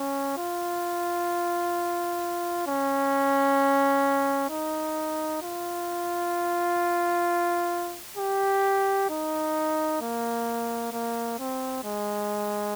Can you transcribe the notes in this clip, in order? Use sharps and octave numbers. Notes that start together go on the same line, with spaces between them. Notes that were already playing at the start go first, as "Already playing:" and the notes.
Already playing: C#4
F4
C#4
D#4
F4
G4
D#4
A#3
A#3
C4
G#3